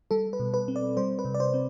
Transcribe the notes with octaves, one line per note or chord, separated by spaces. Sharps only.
G3 A4
B4
B2
B4
C4
D5
G3 C5
B4
C3
D5
C5
C4